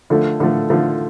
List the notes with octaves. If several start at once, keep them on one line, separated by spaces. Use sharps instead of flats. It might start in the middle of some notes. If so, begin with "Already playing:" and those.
D3 F3 A3
D3 F3 A3
D3 F3 A3